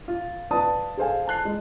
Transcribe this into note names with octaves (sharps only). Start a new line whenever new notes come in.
F4
F4 B4 D5 A5 D#6
G#4 A4 C5 F5 G#5
A5 F#6 C7
G#3